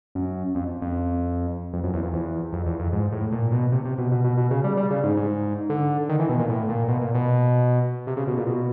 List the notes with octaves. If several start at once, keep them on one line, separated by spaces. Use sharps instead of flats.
F#2
F2
F2
F2
F#2
E2
F2
E2
F2
E2
F2
G#2
A2
A#2
B2
C3
C3
B2
B2
B2
B2
C#3
G3
G3
C#3
G#2
G#2
D3
D#3
E3
B2
A#2
A2
A#2
B2
A#2
B2
C3
C#3
B2
A#2
B2